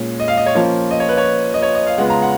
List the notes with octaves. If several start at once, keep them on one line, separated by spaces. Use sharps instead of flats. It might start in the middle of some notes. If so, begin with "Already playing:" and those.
Already playing: A#2 G#3 C#4
D#5
F5
D#5
C#5
F3 A#3 C#4 F4
D#5
C#5
B4
C#5
D#5
C#5
D#5
F5
C#3 G#3 B3 F4 F#5
A#5
F#5